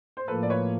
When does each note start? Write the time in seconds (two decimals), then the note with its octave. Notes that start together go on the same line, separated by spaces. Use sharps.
0.17 C5
0.27 A2 F3 A#3 A4 B4
0.43 D5
0.50 B4 C#5